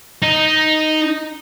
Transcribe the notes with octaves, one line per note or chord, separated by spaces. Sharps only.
D#4